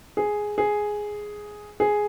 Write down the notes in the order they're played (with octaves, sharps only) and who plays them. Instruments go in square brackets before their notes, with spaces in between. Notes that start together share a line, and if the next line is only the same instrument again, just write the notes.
[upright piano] G#4
G#4
G#4